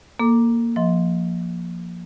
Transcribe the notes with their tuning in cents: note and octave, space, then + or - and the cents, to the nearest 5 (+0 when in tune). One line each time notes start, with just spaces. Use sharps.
A#3 +0 A4 +15 D6 +0
F3 +0 D#5 +30 C6 +0